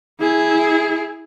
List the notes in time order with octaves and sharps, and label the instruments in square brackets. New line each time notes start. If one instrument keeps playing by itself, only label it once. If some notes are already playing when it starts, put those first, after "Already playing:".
[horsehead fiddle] E4 G#4